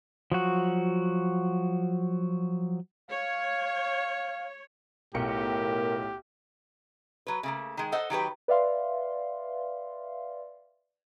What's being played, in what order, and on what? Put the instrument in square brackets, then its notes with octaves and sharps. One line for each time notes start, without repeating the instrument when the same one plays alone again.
[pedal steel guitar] F3 F#3 F#4
[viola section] C#5 [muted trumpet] F5
[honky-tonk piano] B1 G5 C#7 [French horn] A2 [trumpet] G4 [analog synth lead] A#4
[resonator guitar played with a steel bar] F#3 B4
C#3 A3 A#3
D#3 G#3
A4 C5 D#5 F#5
D#3 F#3 G4 B4
[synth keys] B4 D5 E5 F5 C6